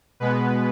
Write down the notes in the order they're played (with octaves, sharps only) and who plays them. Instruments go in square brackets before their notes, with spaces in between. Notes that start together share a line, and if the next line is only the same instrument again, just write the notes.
[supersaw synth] B2 G#3 B3 B4